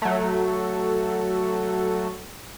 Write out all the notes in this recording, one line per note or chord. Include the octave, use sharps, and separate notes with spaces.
F#3 A3